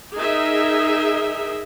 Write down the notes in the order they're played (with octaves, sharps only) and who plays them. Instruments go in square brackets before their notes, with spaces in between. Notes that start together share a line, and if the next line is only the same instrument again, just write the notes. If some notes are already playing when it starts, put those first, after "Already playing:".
[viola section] D#4 G#4 A#4 D#5 E5